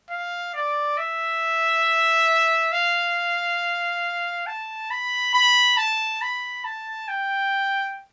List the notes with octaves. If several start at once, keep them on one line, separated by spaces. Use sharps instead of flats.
F5
D5
E5
F5
A5
B5
B5
A5
B5
A5
G5